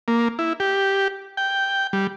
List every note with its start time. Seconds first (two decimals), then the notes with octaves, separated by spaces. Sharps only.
0.08 A#3
0.39 E4
0.60 G4
1.37 G5
1.93 G3